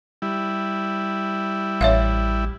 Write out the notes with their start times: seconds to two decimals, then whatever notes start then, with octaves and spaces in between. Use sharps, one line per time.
0.22 G3 E4
1.81 A1 C#5 E5 F5